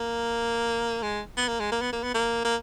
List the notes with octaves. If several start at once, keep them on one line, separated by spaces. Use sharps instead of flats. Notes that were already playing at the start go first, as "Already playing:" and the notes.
Already playing: A#3
G#3
B3
A#3
G#3
A#3
B3
A#3
B3
A#3
A#3